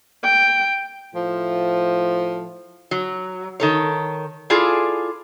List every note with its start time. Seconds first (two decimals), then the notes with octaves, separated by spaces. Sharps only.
0.24 G5
1.13 A2 F3
2.91 F#3
3.60 D#3 A4 C#5
4.50 E4 F4 G#4 A4 D5